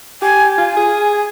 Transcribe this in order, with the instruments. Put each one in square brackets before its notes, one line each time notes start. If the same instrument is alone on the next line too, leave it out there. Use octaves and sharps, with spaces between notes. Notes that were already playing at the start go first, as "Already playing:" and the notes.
[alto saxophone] G4 [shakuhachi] G#5
[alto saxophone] F4 [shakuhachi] G#5
[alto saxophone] G#4